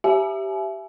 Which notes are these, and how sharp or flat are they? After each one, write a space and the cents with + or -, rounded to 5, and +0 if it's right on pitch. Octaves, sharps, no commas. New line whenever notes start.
G4 -10 E5 +15 G#5 +40